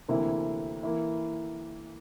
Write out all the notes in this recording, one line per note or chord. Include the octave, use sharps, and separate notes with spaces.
D2 C3 E3 A#3 E4
E3 A#3 E4